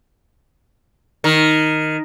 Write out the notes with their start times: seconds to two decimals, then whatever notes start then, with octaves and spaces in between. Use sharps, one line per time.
1.24 D#3